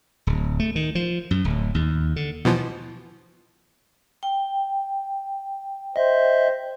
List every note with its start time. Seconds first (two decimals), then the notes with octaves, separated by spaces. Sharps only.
0.27 D1
0.60 A3
0.76 D#3
0.95 F3
1.31 F#2
1.45 D1
1.75 D#2
2.16 D3
2.45 B2 E3 F3
4.23 G5
5.96 C5 D#5 E5